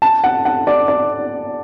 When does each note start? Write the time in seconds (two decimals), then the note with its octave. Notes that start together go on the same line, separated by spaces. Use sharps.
0.02 A5
0.24 F#5
0.45 F#5
0.67 D5
0.88 D5